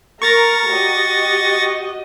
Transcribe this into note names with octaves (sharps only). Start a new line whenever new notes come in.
A#4 A#5 C#6 A6 A#6
F#4 G4 D#5